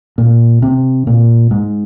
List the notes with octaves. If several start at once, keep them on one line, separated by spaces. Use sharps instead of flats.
A#2
C3
A#2
G#2